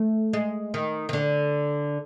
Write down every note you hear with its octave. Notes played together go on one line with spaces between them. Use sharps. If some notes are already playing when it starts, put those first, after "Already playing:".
Already playing: A3
G#3
D#3
D#3
D3